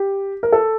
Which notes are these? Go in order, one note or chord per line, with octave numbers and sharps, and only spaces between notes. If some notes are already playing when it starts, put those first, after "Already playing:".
Already playing: G4
A#4
A4